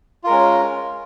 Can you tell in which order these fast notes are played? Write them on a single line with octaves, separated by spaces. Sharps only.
F4 A#4 G#3 C#4